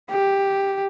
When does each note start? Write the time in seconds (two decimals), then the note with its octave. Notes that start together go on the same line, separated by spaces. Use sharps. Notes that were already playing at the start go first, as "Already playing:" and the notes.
0.10 G4